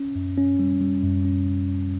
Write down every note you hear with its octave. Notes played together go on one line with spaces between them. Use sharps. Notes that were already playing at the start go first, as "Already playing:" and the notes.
Already playing: C#4
F#2
C#4
G3
G3
F#2
C#4